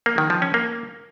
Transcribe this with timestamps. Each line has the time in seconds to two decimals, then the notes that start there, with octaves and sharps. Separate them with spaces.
0.06 A#3
0.18 D#3
0.30 F3
0.42 C#4
0.54 A#3